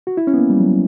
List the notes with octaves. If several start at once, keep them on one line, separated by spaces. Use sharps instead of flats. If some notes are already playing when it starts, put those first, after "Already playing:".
F#4
E4
C#4
B3
A#3
G3
F#3